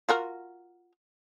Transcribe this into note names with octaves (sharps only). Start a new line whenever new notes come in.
F4 F#4 A#4